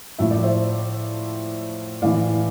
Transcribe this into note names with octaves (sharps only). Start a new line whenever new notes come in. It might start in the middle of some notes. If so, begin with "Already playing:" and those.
A2 F3 E5
D5
C5 E5
A2 E3 D5 F5